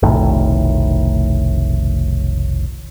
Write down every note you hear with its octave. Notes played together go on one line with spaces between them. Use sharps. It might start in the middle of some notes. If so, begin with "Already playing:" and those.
F1 B1 A2 D#3